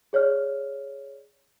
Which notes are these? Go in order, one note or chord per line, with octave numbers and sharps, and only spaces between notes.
G#4 C#5 D5 F6